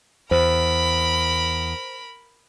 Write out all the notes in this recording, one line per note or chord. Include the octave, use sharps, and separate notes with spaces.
E2 A#4 C5 B5